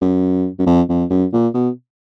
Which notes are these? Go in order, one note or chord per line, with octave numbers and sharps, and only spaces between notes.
F#2
F#2
F2
F2
F#2
A#2
B2